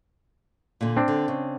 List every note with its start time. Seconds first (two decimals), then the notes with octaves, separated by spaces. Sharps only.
0.81 A#2 D3
0.97 C4 D4
1.08 D3
1.28 C#3